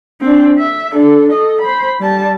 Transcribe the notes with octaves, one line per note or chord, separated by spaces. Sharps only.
C4 D4
E5
D4 A4
A4 D#5
C5 B5
G3 A5